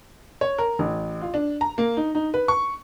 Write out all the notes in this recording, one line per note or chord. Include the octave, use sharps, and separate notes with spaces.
C#5
A#4
A1
F4
D4
A#5
A#3
D#4
D#4
B4
C#6